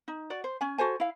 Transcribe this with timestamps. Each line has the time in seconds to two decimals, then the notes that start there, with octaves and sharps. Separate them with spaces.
0.08 D#4
0.30 F#4 D5
0.44 C5
0.61 C#4 G#5
0.78 F#4 A4 C5 G#5
1.00 E4 F5